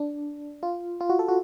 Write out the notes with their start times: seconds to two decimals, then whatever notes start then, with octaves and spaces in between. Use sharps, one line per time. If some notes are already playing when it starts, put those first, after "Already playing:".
Already playing: D4
0.63 F4
1.01 F4
1.10 F#4
1.19 A4
1.28 F#4